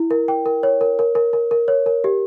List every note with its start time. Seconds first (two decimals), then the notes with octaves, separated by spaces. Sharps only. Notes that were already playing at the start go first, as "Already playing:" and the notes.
Already playing: E4
0.11 A#4
0.28 G5
0.46 A#4
0.63 C#5
0.81 A#4
0.99 A#4
1.15 A#4
1.33 A#4
1.51 A#4
1.68 C#5
1.86 A#4
2.04 G4